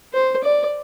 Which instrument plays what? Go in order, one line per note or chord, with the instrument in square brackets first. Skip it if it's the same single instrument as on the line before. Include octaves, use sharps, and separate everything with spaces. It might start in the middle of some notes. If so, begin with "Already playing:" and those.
[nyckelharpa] C5
D5